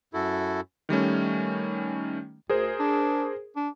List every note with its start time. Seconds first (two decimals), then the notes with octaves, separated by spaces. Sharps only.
0.14 F#2 E4 F#4 A4
0.89 D#3 G3 A3 C#4
2.50 D2 G#4 A#4 C5
2.80 D4
3.56 D4